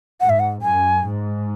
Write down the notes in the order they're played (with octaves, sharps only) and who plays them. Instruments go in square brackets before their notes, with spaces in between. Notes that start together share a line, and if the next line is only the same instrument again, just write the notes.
[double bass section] G#2 [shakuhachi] F#5
[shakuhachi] E5
F#5
[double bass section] F#2 [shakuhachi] G#5
[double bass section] G#2